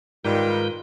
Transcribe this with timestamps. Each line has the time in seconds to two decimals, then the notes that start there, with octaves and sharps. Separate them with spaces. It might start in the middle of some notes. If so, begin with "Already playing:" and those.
0.24 G#2 D#3 G3 G#3 F4 A#4 B4 G6